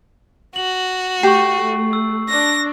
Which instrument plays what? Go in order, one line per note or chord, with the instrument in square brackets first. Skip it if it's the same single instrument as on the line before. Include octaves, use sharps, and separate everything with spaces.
[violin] F#4 [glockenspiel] F#7
[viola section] A3 [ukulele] G4 [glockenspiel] C#6 C7
[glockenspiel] E6
[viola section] D4 [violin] A#6